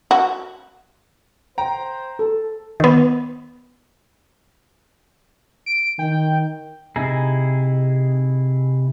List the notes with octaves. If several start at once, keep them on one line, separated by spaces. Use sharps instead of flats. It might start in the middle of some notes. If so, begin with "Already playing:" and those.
F#4
C5 G5 A#5
A4
D#3 B3
D7
D#3 G5
C3 D#4 E4 G#4